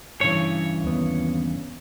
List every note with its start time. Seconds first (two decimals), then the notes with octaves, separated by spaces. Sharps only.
0.21 G2 C#3 E3 C#5
0.84 D#2 B3